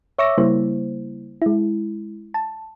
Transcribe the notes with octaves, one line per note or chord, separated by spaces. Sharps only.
C#5 E5 C#6 D6 E6 A#6
C#3 G3 A#3 E4 C5
G#3 E4
A5